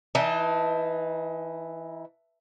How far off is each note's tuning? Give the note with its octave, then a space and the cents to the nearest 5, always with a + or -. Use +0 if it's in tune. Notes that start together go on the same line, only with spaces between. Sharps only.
E3 +0 D#4 +30 A5 +0